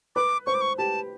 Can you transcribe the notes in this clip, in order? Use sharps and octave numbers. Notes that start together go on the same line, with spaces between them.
B4 D6
C5 C#6
D6
C#6
G4 A5